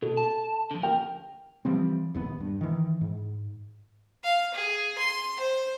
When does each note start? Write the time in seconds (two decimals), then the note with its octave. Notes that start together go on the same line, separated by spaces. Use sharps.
0.02 B2 A4
0.17 A5
0.71 D3 F3
0.83 A#4 G5
1.65 E3 F3 G3 C4
2.15 D#1 D#2 B3
2.40 G2
2.61 D#3 E3
3.01 G#2
4.24 F5
4.54 G#4
4.98 C6
5.40 C5